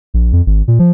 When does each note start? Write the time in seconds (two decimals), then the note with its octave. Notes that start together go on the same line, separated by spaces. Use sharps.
0.14 A#1
0.33 F2
0.46 G#1
0.68 A#2
0.79 F3